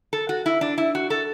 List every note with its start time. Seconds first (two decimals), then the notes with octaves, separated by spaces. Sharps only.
0.13 A4
0.29 F#4
0.46 E4
0.61 D4
0.78 E4
0.95 F#4
1.10 A4